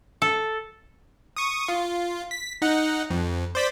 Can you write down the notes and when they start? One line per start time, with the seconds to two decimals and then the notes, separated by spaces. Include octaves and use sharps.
0.22 A4
1.37 C#6 D#6
1.68 F4
2.31 B6
2.62 D#4 F#5
3.10 F2
3.55 C5 D5 B6